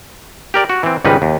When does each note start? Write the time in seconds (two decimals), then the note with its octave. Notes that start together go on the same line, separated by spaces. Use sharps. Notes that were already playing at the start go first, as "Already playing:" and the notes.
0.54 G4 A#4 D5
0.70 F#4
0.83 E3 C4
1.05 C#2 G#2 D#3 G3 D#4 B4
1.22 D#2